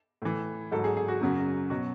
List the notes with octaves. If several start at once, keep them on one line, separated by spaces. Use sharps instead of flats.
A2 E3
G#2 F#3 A4
G#4
G#4
F#4
F#2 C#3 F#3
B2 F#3 F#4